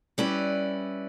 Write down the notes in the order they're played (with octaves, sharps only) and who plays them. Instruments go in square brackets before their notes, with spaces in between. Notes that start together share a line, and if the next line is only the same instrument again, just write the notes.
[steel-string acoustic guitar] G3 C#4 E4 B4 D5